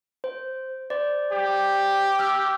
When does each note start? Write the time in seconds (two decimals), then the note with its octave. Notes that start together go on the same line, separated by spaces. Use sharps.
0.24 C5
0.90 C5 D5
1.32 G4
2.19 E6 F6